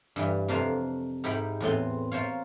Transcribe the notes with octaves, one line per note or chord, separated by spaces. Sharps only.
G2 E3 G3
F2 C3 D4 A#4 C5 F5
G#2 D#4 E4 G4 A#4 B5
E2 A2 B3 C4
F4 A#4 C5 C#5 F5